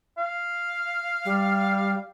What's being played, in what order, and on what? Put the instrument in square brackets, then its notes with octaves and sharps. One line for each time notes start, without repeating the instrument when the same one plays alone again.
[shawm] F5
[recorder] G3